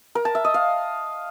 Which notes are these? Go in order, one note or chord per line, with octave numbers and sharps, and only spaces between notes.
A#4
A5
E5
D#5
F5